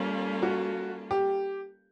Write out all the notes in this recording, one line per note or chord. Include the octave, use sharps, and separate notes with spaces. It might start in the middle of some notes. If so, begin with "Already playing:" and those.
Already playing: G3 A#3 C#4 F4 A4
F#4
G4